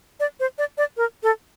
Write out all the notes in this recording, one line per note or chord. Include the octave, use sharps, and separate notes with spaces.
D5
C5
D5
D5
A#4
A4